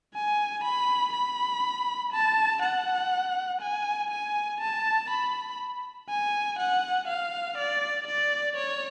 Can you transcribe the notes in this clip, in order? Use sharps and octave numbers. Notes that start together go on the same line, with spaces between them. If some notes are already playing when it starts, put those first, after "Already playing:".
G#5
B5
B5
A5
F#5
G#5
G#5
A5
B5
G#5
F#5
F5
D5
D5
C#5